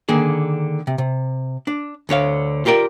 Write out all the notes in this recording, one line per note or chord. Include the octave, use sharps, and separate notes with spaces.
D3 D#3 A#3 G#4
C3
C3
D4
D2 D3 C#5 F5
F4 G4 A#4 D5